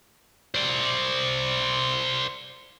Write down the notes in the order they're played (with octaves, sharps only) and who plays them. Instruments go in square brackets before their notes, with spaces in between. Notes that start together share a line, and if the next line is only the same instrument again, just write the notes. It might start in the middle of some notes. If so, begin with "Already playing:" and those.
[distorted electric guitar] C5 D5